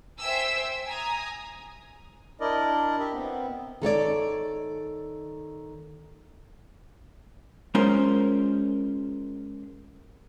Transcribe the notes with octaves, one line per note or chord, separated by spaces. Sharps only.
C5 E5 G5 G#5 E6
G#5 A#5 D#6
D4 E4 A#4 D5 D#5
G4 D#5 E5
B3 C4
D#3 A4 C#5 D5
G#3 C#4 F4 A#4 C5